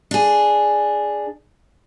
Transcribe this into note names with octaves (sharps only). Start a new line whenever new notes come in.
D4 G#4